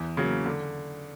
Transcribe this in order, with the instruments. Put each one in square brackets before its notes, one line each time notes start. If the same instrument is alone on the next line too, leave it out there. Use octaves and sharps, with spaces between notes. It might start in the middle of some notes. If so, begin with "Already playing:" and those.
Already playing: [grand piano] E2
C#3 F#3 A#3
D3